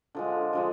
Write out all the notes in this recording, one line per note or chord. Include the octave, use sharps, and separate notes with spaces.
D3 F3 G#3
D3 F3 G#3